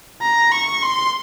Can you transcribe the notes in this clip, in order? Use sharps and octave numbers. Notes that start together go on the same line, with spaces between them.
A#5
C#6
C6